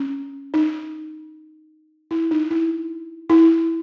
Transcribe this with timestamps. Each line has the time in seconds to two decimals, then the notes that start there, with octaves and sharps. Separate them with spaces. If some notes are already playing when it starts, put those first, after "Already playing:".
Already playing: C#4
0.54 D#4
2.11 E4
2.31 D#4
2.50 E4
3.30 E4